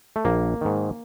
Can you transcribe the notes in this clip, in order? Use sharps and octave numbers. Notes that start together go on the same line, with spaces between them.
A3
A#1 A#3
G#2 D#3